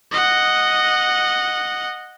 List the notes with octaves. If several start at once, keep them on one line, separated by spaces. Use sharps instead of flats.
D#5 F#5